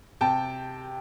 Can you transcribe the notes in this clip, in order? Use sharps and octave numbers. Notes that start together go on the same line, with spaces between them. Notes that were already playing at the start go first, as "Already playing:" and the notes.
C3 G5 A5